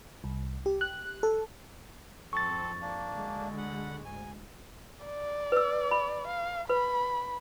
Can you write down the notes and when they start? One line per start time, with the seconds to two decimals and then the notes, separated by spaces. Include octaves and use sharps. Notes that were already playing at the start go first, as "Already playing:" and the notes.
0.24 C2
0.66 G4
0.81 F#6
1.23 A4
2.33 F2 G#2 C4 A4 C#6 A6
2.82 A#3 D4
3.14 D2 D3 G#3
3.58 F#5 B5
4.05 D2 G#2 G#5
5.05 D5
5.52 B4 E6
5.91 B5
6.27 F5
6.69 B4 B5